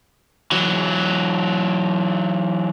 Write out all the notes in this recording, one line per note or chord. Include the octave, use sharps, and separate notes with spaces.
E3 F#3